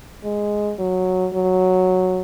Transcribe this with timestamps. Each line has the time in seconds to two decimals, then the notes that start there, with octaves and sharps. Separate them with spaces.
0.24 G#3
0.79 F#3
1.34 F#3